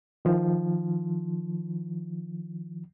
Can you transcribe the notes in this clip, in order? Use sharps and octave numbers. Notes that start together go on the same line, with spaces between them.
D#3 F3